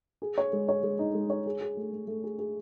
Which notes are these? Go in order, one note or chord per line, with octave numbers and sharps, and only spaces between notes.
G#4
C#5
G#3
C#5
G#3
D#4
G#3
C#5
G#4
G#4
A3
A3
A3
G#4
G#4